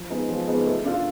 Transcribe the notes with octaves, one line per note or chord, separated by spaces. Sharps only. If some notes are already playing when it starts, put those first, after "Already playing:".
Already playing: F3
G#3 B3 D#4 G#4
F3
G#3 B3 D#4 G#4
A3
D4 F4 A4